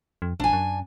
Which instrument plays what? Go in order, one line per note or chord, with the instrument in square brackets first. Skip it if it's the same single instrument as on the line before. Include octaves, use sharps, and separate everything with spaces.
[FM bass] F2
[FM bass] A#1 [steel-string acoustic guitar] D4 G#5
[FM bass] F#2